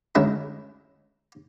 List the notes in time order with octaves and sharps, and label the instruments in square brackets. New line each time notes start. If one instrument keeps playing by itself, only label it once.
[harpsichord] D2 G#3 C#4 E4 E5 A#5